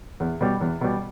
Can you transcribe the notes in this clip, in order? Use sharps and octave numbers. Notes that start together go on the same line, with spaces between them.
E2
B2 G3
E2
B2 G3